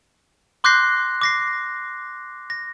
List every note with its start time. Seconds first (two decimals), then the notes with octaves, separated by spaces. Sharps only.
0.64 C6 D6 F#6 G6 A#6 C7
1.21 D6 A#6 C7
2.50 A#6